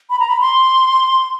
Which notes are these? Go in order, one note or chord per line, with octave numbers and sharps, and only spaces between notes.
B5
A#5
B5
C6